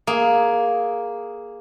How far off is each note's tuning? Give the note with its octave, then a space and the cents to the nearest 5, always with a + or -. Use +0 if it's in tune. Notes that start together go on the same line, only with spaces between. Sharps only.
A#3 +5 G#4 +0